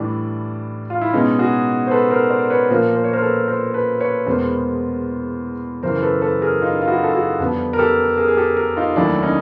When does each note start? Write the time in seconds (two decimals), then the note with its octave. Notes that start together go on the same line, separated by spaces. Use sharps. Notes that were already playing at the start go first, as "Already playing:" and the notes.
Already playing: A2 E3 G3 D4
0.90 F4
1.01 E4
1.13 B2 G#3 B3 C#4 D#4
1.39 F#4 G#4
1.87 C5
1.91 A4 B4
2.11 A#4 C5
2.30 C5 D5
2.50 B4 C#5
2.70 A#2 F3 A#3 A#4 C5
2.96 C5
3.04 C#5
3.13 A#4 C5
3.22 A4 B4
3.48 A#4 C5
3.74 A4 B4
4.00 B4 C#5
4.26 E2 B2 G#3 B3 A#4 C5
5.83 F#2 C#3 E3 A#4 C5
6.03 A4 B4
6.22 A4 B4
6.42 G#4 A#4
6.61 D#4 F4
6.82 F4
6.88 E4 F#4
7.03 A4
7.13 F#4 G#4
7.39 F2 D3 G3 B3
7.73 A#4
7.79 G4 A4
8.17 G#4 A#4
8.28 G#4
8.37 G4 A4
8.57 G#4 A#4
8.76 D#4 F4
8.93 F4
8.96 D#2 D#3 F#3 A3 D4 E4
9.22 C#4 D#4